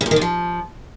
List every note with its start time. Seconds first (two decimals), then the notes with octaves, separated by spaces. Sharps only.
0.01 C#3
0.06 A#2
0.11 D#3
0.16 C3
0.21 F3